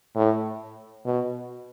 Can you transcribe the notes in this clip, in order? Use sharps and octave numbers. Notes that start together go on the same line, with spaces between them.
A2
B2